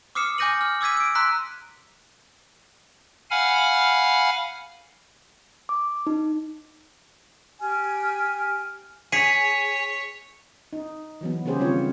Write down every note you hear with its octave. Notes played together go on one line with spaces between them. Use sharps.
D6 D#6 F6 C7 C#7 E7
G#5 D6 G6 A#6 D#7 F#7
F6
D6 E6 G#6 B6 D#7
D7 D#7
A#5 C6 E6 F#6 B6
F5 F#5 G#5 B5 F6
D6
D#4
G4 G#5 F6
G#4 C#5 G#5 B6 C#7 D#7
D#4
E3 F#3 B3
C#3 A#3 C#4 G4 G#4 C5
D#3 G3 C4 F4 C#5